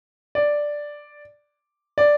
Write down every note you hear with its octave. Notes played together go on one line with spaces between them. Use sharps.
D5
D5